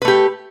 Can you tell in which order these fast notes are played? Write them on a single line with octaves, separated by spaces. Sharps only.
B4 A3 G4